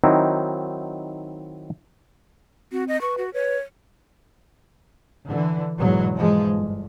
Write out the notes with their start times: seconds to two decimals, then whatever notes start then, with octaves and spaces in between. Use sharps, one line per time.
0.04 D#3 F#3 C4 D#4 E4
2.72 C4 F#4
2.88 D#5
3.01 B4 C#6
3.18 F#4
3.34 B4 C#5
5.27 D3 E3
5.78 E2 G#2 B2 F#3
6.16 G#2 E3 F3 G#3
6.54 G1